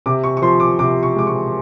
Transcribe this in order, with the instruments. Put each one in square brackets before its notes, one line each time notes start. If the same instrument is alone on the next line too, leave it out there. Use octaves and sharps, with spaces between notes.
[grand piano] C3 D6
C#6
C#6
F3 C6
D6
C3 D6
C#6
G#3 D6
C#6